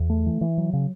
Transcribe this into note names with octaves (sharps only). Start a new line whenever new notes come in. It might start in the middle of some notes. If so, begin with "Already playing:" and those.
Already playing: E2
A3
E3
E3
F#3
C#3